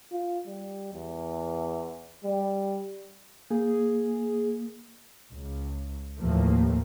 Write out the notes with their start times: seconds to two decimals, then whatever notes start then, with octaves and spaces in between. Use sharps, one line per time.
0.12 F4
0.47 G3
0.94 E2
2.24 G3
3.51 A#3 G#4
5.30 C#2
6.19 D#2 A2 E3 F3 A3 A#3